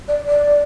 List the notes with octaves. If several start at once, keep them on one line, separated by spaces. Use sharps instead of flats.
D5
D5